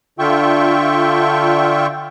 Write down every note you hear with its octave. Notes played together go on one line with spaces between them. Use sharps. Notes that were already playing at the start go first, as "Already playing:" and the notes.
D3 F4 E5 G5 C#6